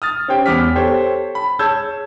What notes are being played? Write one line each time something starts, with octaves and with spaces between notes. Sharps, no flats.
D#6 F6 A6
C#4 G4 C5 G5
E2 B3 D6 F6 B6
G4 A4 C5 C#5
B5
G#4 C#5 A5 E6 G6 G#6